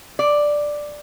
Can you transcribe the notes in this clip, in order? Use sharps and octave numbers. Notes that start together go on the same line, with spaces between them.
D5